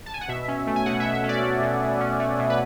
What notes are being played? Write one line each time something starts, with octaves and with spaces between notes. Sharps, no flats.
A5
G#5
F#5
B2 E5
C#4
A3
G#5
B2 F#5
E5
B2
E5
C#4
D5
A3
B2
B2
C#4
A3
B2
B4